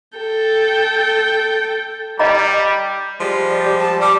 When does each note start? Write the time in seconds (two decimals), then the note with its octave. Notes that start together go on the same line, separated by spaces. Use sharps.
0.17 A4 G5
2.19 G3 D5 D#5 A#5
3.20 F3 G3 G#3
3.50 D5
3.62 G4
3.79 A5
4.01 G3 D6